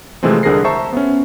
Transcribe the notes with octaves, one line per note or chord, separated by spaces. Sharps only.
C3 E3 F3 G#3 A3 C4
C2 D3 G#4 A#4 A#6 C7
C5 E5 A5 A#5 C#6
B3 C#4